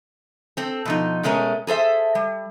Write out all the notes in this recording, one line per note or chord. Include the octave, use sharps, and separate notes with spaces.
C4 A4
B2 F3 D#4
B2 G#3 A3 C#4 A#4
G#4 A4 C5 E5
G3